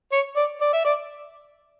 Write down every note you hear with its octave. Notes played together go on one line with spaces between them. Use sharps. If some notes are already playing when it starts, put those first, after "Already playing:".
C#5
D5
D5
E5
D5